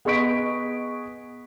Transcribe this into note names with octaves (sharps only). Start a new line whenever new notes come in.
B3 G#4 D#5 C#6 B6 D7